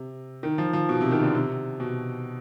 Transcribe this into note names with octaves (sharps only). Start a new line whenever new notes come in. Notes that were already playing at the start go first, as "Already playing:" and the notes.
Already playing: C3
D#3
F3
F3
B2
C3
D#3
D3
C3
B2